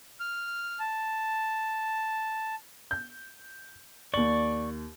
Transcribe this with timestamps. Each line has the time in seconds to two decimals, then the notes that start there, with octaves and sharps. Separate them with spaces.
0.20 F6
0.80 A5
2.91 G6
4.14 D#2 D5 C#6 F#7